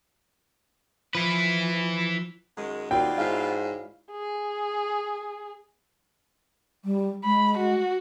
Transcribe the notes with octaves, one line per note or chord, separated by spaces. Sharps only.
F3 E4 B4
F#2 D#3 G#3
D#2 B2 C4 D#4 F4 F#4 D5 G5
G#2 E4 C#5 F5
G#4
G3
G#3 B5
F#4